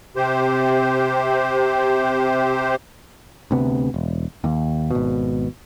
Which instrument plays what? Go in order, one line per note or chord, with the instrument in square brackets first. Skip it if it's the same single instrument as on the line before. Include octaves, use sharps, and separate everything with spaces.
[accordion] C3 G4 C5
[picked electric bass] D2 C3 B3
E1
D#2
G#1 B2